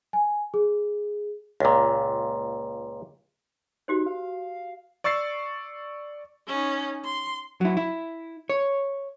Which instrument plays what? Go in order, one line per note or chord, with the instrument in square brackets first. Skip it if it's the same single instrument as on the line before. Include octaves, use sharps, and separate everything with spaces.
[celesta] G#5
G#4
[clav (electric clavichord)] C#2 A#2
[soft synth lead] D#4 [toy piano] F#4 G4 C5
[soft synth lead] F5
[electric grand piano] D5 C#6 E6 A6 C7
[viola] C#4 D#4
C6
[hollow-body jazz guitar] F#3 E4
E4
C#5